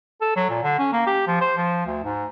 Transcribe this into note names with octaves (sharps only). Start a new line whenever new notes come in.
A4
F#3
A#2
D3
C#4
A#3
G4
F3
C5
F3
D2
G#2